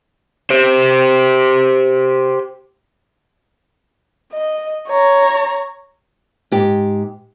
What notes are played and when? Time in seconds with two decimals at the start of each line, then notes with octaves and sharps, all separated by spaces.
0.50 G4 C5
4.32 D#5
4.88 C#5 A#5
6.52 G#2 G4